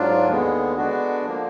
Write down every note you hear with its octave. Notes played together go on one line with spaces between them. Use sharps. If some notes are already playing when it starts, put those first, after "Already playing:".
Already playing: G#2 F#3 D4 F4
D#2 D3 G#3 B3
D3 G#3 B3 D4 F#4
D3 F3 A#3